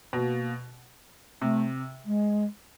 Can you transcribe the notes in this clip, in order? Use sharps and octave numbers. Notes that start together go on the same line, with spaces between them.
B2 A#3
C3 A3
G#3